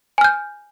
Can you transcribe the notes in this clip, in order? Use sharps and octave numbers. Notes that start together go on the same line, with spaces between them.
G#5 F6 G6